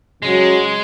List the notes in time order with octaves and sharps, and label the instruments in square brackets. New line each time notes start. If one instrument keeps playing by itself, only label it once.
[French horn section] C#3 F#3 [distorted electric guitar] G#3